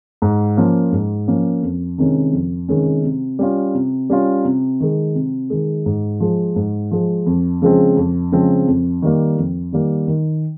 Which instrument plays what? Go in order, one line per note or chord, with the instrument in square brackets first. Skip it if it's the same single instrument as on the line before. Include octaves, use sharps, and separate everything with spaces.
[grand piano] G#2
F3 A#3 C#4
G#2
F3 A#3 C#4
F2
C3 D#3 G#3 C#4
F2
C3 D#3 G#3 C#4
C3
G3 C#4 F4
C3
G3 C#4 F4
C3
D#3 G#3
C3
D#3 G#3
G#2
F3 G#3
G#2
F3 G#3
F2
C#3 F3 G#3 C4
F2
C#3 F3 G#3 C4
F2
D#3 G3 A#3
F2
D#3 G3 A#3
D#3